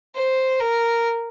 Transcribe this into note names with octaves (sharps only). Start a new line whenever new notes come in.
C5
A#4